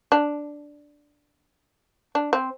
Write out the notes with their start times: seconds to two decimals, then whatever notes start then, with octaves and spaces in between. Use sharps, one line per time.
0.12 D4
2.15 D4
2.33 C4